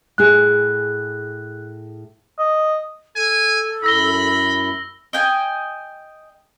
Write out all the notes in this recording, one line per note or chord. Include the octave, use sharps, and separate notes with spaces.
A2 G#4 F#6
D#5
A4 G#5
F#2 E4 B5 E6 A#6 G7
D#5 G5 G#5